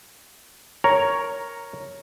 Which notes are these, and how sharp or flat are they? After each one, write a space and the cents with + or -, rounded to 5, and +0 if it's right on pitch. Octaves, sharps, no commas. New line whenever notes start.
A#4 +0 C#5 +0 A#5 +0